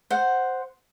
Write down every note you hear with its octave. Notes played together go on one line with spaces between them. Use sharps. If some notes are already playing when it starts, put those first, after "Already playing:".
C5 F#5